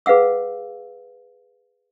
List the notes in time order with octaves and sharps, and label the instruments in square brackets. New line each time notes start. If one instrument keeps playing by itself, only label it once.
[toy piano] G#4 B4 F5 F#5 E6